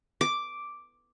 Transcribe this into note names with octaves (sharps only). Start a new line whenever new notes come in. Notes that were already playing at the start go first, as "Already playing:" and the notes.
D6